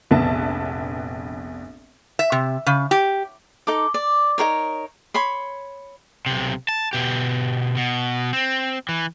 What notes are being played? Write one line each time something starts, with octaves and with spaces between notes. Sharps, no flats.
F1 A#1 B3 E5 A5
E5
C3
C#3
G4
D#4 A4 D6
D5
D#4 G#4 A#4 C#5
C#5 B5 C6
B1 C3
A5
B2 G4
B2
C4
E3